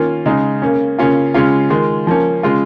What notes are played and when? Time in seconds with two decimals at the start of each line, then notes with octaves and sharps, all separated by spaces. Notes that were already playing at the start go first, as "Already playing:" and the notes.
Already playing: D#3 A#3 C#4 F4
0.26 C#3 G#3 D#4
0.62 C#3 A#3 C#4
0.99 C#3 A#3 C#4 F4
1.34 C#3 G#3 C#4 F4
1.70 D#3 G#3 F4
2.07 F3 A#3 C#4
2.43 C#3 G#3 F4